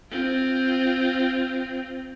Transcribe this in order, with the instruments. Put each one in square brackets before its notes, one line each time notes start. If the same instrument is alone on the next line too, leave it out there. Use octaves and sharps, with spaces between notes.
[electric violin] C4 F4